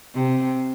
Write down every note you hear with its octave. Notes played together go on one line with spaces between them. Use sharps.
C3